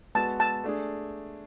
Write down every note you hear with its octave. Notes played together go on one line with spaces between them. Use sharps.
G#3 B3 F#4 A5
A5
A3 D4 G#4